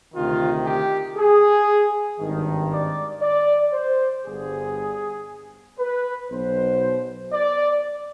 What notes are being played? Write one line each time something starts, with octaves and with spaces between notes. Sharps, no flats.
D2 C3 D#3 F4
G4
G#4
G#1 G2 D#3
D5
D5
C5
G1 G2 D3 G#4
B4
B1 B2 C5
D5